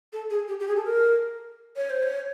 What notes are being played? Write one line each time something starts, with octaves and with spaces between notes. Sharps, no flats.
A4
G#4
G4
G4
G#4
A4
A#4
C#5
C5
C#5